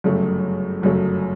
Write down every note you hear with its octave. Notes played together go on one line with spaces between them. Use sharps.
G1 F#2 C#3 F#3 A3
G1 F#2 C#3 F#3 A3